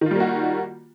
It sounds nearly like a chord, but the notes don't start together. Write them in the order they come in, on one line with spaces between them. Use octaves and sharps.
D#3 F4 G3 A#3 F#4